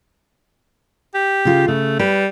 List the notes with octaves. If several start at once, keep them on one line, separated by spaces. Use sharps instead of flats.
G4
C#3 F4
C#3 A3
G3 B4